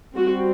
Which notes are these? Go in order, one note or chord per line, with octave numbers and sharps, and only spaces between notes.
G3 C4 F#4